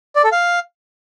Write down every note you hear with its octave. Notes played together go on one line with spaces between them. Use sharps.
D5
A4
F5